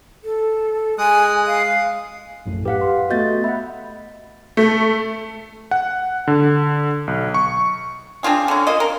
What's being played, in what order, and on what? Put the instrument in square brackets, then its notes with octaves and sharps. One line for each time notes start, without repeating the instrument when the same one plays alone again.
[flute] A4
[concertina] G#3 D#6 F#6 [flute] G#5
[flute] F5
[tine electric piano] A#1 F#2 A2
[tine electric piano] G4 F#5 [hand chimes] B4 F5
[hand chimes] C6
[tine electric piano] A3 B3 F#4 [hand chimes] D#5 G6 A6
[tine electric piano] E5 F#5 [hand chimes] B5
[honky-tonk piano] A3
[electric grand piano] F#5
D3
B1
C#6
[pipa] C4 D4 F4 G#4
D3 C#4
A#3 F4 D#5
A#4